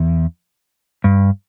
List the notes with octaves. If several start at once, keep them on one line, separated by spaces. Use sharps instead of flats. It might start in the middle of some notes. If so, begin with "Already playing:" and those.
Already playing: E2
G2